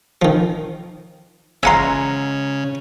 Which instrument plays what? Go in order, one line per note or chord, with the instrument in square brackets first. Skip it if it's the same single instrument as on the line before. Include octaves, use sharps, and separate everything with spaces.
[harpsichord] D#3 F3
[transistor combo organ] C#3 [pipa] G#3 F4 A#5 [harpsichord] E5 F#5 C6